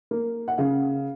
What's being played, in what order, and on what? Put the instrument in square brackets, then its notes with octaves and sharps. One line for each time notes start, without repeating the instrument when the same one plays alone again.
[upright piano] A#3
F#5
C#3 F5